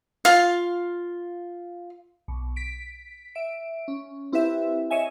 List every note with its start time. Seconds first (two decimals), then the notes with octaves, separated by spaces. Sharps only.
0.25 F4 F5
2.28 B1
2.56 B6 D7
3.35 E5 D7
3.88 C#4
4.32 C4 E4 G4 B4 E5
4.91 C#5 D#5 E5 G#5